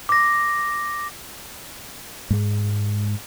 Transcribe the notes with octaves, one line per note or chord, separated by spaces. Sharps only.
D6 A#6
G#2 G#3